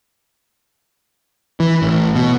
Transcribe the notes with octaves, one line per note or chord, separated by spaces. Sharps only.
E3
A1
B2